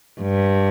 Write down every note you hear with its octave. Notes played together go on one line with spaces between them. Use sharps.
G2